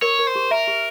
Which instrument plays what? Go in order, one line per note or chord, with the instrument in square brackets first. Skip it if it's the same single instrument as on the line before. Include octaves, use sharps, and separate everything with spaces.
[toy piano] A#4 [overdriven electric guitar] C#5
[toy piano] A#4
[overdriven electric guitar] C5
[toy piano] G4
[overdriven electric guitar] A#4 [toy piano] E5
[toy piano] G4